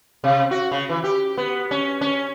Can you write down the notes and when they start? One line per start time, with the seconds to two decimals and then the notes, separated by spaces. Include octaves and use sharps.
0.24 C3
0.51 F#4
0.72 C#3
0.89 E3
1.04 G4
1.38 B3
1.71 C#4
2.01 C#4